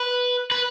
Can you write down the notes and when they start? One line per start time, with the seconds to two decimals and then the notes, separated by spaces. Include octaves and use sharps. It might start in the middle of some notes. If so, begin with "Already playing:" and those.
Already playing: B4
0.51 B4